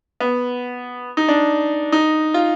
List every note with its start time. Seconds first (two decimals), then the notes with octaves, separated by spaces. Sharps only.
0.20 B3
1.17 D#4
1.28 D4
1.92 D#4
2.34 F4